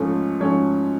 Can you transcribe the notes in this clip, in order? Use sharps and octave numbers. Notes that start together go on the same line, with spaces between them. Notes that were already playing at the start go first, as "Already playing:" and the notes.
Already playing: G#2 F3 A3 C#4
G#2 F3 A3 C#4